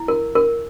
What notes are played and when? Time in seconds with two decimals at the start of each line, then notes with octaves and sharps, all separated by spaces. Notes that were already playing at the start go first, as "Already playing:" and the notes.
Already playing: E4
0.08 A#4
0.35 A#4